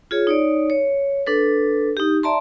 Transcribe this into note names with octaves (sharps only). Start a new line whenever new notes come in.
F4 G#4 C#5
D#4 C#5 D5
C#5
D4 A4 B4
D#4 G4
D5 E5 A5 A#5 C6